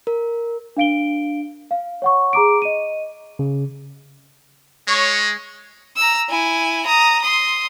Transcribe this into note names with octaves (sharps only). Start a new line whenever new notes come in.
A#4
D4 F5 D7 G7
F5
C#5 F#5 C#6
G#4 A#5 D6 D7
D#5 D#7
C#3
G#3 C#5
A#5 E6
E4 G#5
A#5 D#6
C6 D#6